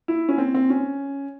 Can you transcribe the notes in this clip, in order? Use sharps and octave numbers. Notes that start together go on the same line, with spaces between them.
E4
C#4
C4
C4
C#4